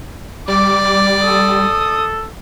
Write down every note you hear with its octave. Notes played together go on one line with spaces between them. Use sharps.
G3 D5 D6
A4 D#6